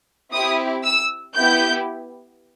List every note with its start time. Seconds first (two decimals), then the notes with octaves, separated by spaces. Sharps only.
0.31 C4 E4 G4 D#6
0.84 E6
1.35 B3 E4 G4 G6